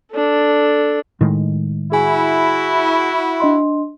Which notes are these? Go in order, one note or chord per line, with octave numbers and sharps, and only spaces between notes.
D4 A4
A2 D#3 G#3
E4 F#4 G#4 G#5
D4 D#5 C6